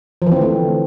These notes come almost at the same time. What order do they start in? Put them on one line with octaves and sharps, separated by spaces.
F3 E3 C4 D3 A3